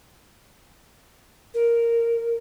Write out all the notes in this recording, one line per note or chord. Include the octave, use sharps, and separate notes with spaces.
A#4